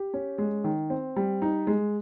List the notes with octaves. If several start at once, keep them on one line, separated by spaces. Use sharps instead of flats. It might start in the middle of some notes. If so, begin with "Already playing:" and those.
Already playing: G4
C#4
G#3
D#3
C4
G3
D#4
G#3